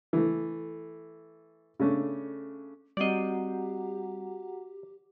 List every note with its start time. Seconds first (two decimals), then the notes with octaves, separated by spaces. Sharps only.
0.13 E3 A3
1.80 C#3 A3 C#4 D4
2.97 G3 C4 F#4 G4 D5 D#5 F#5 A#5